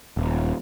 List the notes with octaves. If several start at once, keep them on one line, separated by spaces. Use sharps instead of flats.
D#1